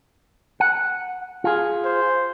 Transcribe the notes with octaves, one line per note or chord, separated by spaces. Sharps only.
F#5
F4 G#4
C5